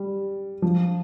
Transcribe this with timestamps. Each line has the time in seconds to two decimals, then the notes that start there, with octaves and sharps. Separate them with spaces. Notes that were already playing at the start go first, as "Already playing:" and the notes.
Already playing: G3
0.62 F3